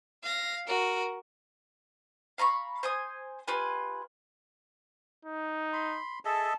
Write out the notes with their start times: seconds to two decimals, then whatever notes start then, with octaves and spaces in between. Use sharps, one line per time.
0.23 F5 A#6
0.67 F#4 A#4
2.38 F5 A#5 B5 C#6
2.83 C5 G#5 D#6
3.48 F4 G4 B4 G#5
5.25 D#4
5.73 B5 C6
6.25 G#4 A4 D#5 E5 A5